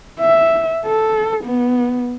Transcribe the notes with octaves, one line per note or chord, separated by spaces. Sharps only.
E5
A4
B3